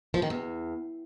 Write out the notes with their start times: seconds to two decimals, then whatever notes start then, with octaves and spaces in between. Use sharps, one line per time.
0.14 F3
0.22 D#3
0.30 E2